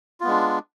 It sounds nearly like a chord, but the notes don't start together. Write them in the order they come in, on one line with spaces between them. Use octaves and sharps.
F4 B3 G#3 D4